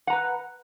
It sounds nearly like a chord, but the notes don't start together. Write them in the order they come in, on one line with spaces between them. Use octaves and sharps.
F#5 A#5 B4